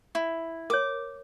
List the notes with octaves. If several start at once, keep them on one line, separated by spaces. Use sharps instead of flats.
E4
A#4 C#5 D6